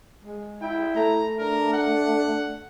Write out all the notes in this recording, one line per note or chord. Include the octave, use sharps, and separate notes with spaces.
G#3
E4 G5
A3 A#5
D4 A#4
F#5